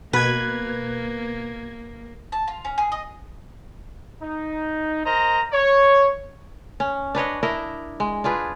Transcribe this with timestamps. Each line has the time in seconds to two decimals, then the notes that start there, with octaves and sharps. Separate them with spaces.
0.13 B2 A#3 B4 G#6
2.32 A5
2.48 F4
2.65 C#4
2.78 G#4
2.92 D#5
4.22 D#4
5.05 A#4 C5 D#5 A#5
5.53 C#5
6.80 C#4
7.15 D4 B4 C#5 D#5
7.43 D4 E4 A#4 D#5
8.00 G#3
8.24 D4 F4 G#4 B4